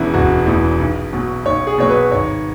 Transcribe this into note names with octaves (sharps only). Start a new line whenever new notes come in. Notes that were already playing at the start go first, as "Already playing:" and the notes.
Already playing: E1 E2 E3 C#4 E4
E1 F#4
E2 E3
B1
B2 F#3
B1 C#5
G#4
B2 F#3 C#5
B4
G#1 C#5